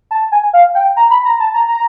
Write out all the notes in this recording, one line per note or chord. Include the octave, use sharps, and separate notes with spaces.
A5
G#5
F5
G5
A#5
B5
A#5
A5
A#5
A#5